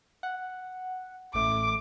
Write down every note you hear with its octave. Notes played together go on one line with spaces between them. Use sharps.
F#5
A1 A3 D6